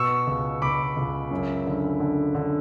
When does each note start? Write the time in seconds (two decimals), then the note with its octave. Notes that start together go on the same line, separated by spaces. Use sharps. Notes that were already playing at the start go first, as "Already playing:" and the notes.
Already playing: B2 C#6 E6
0.27 C#2
0.62 C#2 B5 D6
0.97 C#2
1.31 F#2
1.66 D3
2.00 D3
2.35 D3